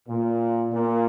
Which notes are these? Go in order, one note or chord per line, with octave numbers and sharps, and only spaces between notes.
A#2
A#2